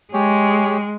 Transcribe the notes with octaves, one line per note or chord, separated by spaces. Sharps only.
G#3 G4 G#4 C#5